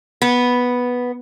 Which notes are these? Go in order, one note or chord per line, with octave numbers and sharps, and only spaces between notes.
B3